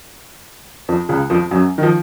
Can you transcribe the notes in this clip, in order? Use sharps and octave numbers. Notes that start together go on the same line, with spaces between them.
F2 F3
C#2 C#3
F2 F3
F#2 F#3
D#3
F3